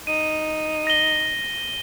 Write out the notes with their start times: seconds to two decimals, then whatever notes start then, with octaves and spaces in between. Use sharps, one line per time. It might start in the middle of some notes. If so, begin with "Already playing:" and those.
0.07 D#4 D#7
0.87 A#6 G7